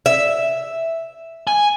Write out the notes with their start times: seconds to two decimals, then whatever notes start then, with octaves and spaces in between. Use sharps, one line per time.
0.06 E5
1.47 G#5